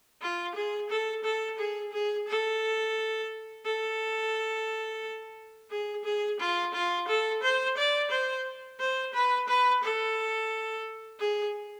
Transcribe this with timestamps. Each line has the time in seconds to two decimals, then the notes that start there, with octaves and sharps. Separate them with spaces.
0.22 F4
0.55 G#4
0.90 A4
1.24 A4
1.58 G#4
1.92 G#4
2.28 A4
3.65 A4
5.70 G#4
6.04 G#4
6.40 F4
6.74 F4
7.08 A4
7.43 C5
7.77 D5
8.11 C5
8.80 C5
9.14 B4
9.48 B4
9.83 A4
11.20 G#4